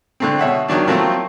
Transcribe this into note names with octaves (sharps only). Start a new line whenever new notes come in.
D3 A3 C4
B2 C#5 E5 F#5
D#3 F#3 D4
F3 F#3 A3 A#3 C4 E4